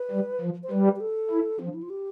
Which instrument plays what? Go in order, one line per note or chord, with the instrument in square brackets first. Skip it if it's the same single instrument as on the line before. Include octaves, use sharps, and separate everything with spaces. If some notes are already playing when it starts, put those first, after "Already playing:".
Already playing: [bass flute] B4
[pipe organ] G3
F3
[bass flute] C5
[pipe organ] G3 [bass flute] B4
[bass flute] G4
A4
[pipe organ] E4
[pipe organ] F3 [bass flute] C4
[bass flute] D4
E4
F4
G4